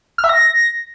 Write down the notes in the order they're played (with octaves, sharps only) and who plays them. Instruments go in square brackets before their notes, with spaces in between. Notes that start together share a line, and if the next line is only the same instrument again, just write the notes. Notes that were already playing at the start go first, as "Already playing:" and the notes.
[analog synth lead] F6
E5
A#6